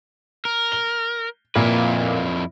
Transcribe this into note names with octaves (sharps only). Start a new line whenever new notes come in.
A#4
G7
F2 A#2 A#3 E4 B4